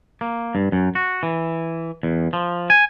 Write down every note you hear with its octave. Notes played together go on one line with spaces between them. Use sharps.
A#3
G2
F#2
F#4
E3
E2
F3
G#5